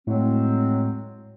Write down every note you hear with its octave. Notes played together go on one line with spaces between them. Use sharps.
A2 F#3 G#3 C4